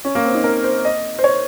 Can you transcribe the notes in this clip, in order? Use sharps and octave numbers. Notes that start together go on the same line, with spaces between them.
C#4
A#3
C4
D#4
A#4
C5
D#5
C5
C#5